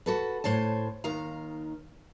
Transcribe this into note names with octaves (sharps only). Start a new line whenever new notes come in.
F#4 A4 B4
A2 C5 C#5 A5
D#2 D#3 F5 A#5